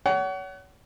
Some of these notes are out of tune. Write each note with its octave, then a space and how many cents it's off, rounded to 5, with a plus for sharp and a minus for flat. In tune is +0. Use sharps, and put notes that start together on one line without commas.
C#5 +35 F#5 +30